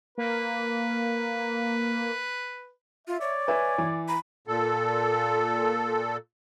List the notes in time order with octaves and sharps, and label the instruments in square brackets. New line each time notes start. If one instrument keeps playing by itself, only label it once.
[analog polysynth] A#3 [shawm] B4
[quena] F4 [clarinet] E5
[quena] C#5 [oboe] D5
[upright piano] B4 E5 [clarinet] G#5
[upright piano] E3
[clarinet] A#5 [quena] B5
[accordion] A#2 A4